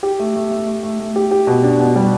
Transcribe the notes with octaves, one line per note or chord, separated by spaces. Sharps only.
G4
A3
A3
A3
A3
A3
A3
G4
G4
B2
D4
B2
G3